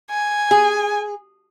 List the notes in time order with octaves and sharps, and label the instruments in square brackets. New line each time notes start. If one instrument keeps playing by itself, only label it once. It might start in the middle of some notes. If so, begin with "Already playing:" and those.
[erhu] G#5
[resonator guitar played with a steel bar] G#4